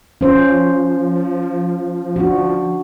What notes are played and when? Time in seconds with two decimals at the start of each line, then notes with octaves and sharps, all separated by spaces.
0.21 F3 C#4 C5
2.16 D4 F#4